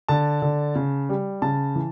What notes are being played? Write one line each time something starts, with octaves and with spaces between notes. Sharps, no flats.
D3 A5
D3
C#3
G3
C#3 A5
E3